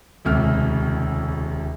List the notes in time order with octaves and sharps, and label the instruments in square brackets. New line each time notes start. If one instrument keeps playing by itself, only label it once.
[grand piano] D#1 C#2 C3 F6